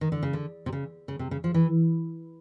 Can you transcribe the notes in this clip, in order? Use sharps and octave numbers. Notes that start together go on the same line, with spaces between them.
D#3
D3
C#3
D3
C3
C#3
C#3
C3
C#3
F3
E3